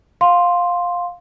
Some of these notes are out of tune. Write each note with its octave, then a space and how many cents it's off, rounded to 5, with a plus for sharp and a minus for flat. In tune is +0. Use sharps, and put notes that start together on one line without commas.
F5 +15 C6 +0